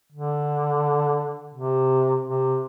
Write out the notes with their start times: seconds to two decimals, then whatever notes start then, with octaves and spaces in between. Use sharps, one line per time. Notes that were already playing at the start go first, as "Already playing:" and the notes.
0.12 D3
1.54 C3
2.26 C3